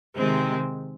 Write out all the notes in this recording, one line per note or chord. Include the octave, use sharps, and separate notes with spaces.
C3 D#3 G#3 C4